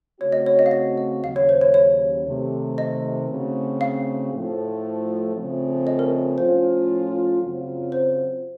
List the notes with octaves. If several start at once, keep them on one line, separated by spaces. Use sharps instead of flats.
C#3 A3 C4 F#4 C#5
D#5
C#5
D#5
F5
D#5
D#5
D#2 C#3 F#3 F5
C#5
C5
C#5
C#5
C3 D#3 A3
D#5
C#3 A3 C4 D#4 F#4
F5
A2 F3 A3
C#3 F3 A3 C4
D#5
A#4
A2 F3 A3 C#4 F4 C5
F#2 C#3 F#3 C4 F4
C5